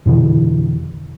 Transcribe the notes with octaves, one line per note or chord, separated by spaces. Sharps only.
F2 B2 D3 E3